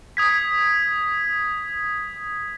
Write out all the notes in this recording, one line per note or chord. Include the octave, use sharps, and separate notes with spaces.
D#6 G#6 B6